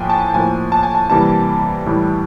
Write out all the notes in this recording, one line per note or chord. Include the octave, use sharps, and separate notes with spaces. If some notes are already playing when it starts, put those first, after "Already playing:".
Already playing: A2 F3 A#3 G5 G#5
A5
A2 F3 A#3 G#5
A5
G#5
A5
C3 E3 G3 A#3 A5
A2 E3 G3